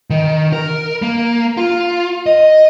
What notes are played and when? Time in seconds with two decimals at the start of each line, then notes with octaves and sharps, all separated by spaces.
0.10 D#3
0.53 A#4
1.02 A#3
1.57 F4
2.26 D#5